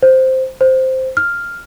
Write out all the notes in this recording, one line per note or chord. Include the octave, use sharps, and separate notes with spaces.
C5
C5
F6